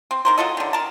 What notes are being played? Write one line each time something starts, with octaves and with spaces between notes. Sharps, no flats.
C4
D#3 A#4 C5
F#3 F4 A4 D#5
D3 D#3
A#4 A5